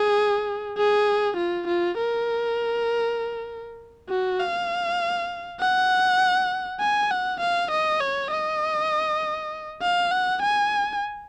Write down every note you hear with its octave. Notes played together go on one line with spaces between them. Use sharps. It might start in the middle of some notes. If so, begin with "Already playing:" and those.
Already playing: G#4
G#4
F4
F4
A#4
F#4
F5
F#5
G#5
F#5
F5
D#5
C#5
D#5
F5
F#5
G#5